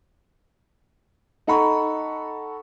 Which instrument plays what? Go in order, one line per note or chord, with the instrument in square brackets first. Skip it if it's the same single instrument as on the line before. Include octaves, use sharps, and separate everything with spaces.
[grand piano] D#4 A4 F#5 A#5 B5 C#6